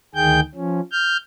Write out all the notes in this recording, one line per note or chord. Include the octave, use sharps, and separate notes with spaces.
D2 D#3 G#4 G5 G6
F3 C#4
F6 G6